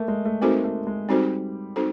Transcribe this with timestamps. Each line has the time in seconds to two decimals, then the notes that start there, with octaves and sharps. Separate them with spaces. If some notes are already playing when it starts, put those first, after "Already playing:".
Already playing: A3 A#3
0.08 G#3
0.25 A3
0.42 A#3 C4 D#4 F#4 A4 C5
0.64 A3
0.87 G#3
1.09 G3 C4 D#4 F#4 A4 C5
1.76 C4 D#4 F#4 A4 C5